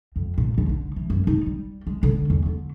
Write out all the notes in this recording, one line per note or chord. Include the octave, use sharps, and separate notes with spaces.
F2
A#2
D#2
D3
E3
F#2
D#4
G3
G#3
D3
E2
D3